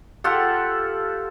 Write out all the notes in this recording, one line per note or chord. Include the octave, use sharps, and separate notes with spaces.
F4 G4 A4 F#5